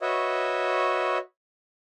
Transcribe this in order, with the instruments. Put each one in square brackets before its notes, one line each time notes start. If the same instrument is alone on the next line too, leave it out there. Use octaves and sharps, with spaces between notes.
[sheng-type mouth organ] F#4 B4 C#5 D#5 E5